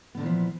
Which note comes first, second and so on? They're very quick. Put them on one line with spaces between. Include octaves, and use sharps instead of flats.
B3 D3 A#2 E3 F3